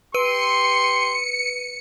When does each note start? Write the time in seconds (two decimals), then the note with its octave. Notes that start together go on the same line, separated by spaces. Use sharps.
0.14 G4 B4 C6 C#7 D#7